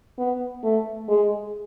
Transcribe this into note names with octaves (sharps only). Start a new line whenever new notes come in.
B3
A3
G#3